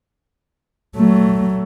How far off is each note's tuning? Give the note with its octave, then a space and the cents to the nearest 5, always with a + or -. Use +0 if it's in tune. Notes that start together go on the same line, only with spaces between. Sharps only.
F#3 +30 A3 +10